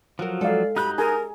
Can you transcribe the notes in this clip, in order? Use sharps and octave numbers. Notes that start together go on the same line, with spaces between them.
F3 F#3 F#4 A#4
G#3 A4 D5 F5
G2 F#3 D#4 G4 B5 F#6 G6
D4 G#4 A#4 G#5 A#5